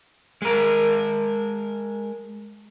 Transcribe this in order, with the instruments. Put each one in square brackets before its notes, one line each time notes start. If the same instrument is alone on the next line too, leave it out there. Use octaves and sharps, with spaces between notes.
[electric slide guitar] G#3 A#4